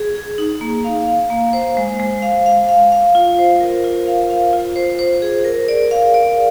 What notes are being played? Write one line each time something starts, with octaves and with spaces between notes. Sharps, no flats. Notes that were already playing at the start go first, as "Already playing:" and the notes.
Already playing: G#4
G#4
D#4
A#3
F5
F5
A#3
C5
G#3
G#3
F5
F5
F5
F5
F4
C5
A#4
F4
F5
F5
F4
C5
C5
G#4
A#4
D5
F5
D5